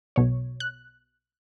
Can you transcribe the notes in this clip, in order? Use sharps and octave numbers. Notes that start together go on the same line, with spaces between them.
B1 B2 C#5
F#6